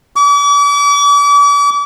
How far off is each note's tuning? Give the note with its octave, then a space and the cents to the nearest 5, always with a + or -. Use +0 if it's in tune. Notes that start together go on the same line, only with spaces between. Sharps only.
D6 -40